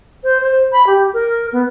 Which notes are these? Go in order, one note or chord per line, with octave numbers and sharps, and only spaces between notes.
C5
C5
B5
G4
A#4
B3